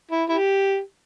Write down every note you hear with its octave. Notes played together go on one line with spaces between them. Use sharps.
E4
E4 G4